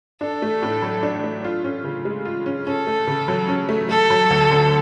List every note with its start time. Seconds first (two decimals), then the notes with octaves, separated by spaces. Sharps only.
0.21 D4 A4
0.42 A3
0.62 A2
0.82 F#3
1.03 D4
1.24 A3
1.44 F4
1.64 C#4
1.84 C#3
2.05 G#3
2.25 F4
2.46 C#4
2.67 C#4 A4
2.87 A3
3.07 C#3
3.28 F#3
3.48 C#4
3.69 A3
3.89 A3 A4
4.10 F#3
4.30 D2
4.51 D3